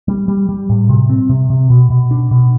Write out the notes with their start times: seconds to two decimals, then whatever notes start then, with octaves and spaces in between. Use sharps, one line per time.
0.08 G3
0.28 G3
0.49 G3
0.69 A2
0.89 C3
1.10 C4
1.29 C3
1.50 C3
1.70 B2
1.90 B2
2.11 D4
2.31 B2